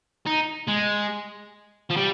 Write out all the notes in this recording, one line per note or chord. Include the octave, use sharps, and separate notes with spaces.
D#4
G#3
F3
G3